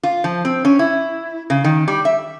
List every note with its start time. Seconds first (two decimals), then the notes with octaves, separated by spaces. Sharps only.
0.03 F4
0.24 F3
0.45 C4
0.65 C#4
0.79 E4
1.50 C#3
1.64 D#3
1.88 G3
2.05 E5